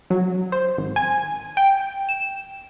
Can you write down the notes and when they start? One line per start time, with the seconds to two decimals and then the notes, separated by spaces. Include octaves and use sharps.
0.10 F#3
0.52 C5
0.78 G#1
0.96 G#5
1.57 G5
2.09 E7